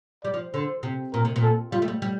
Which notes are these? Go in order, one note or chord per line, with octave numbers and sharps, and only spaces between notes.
G3 D5
F3
D3 C5
C3
A#2 A#4
C3
A#2
A4
G3 F4
A3
G3
G3